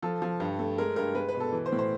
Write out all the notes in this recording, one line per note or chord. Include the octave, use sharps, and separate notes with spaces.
F3 A4
F3
G2
A3
G#3 A#4
G2 A#4
G#3 B4
B4
B2
A4
E3
C5
A2
C5